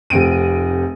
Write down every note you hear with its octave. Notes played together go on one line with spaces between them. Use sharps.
F1 C3 C4 D7 D#7